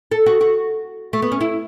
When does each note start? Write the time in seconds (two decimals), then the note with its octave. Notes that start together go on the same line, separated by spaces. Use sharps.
0.11 A4
0.26 F#4
0.41 F#4
1.13 A3
1.22 B3
1.32 C#4
1.41 E4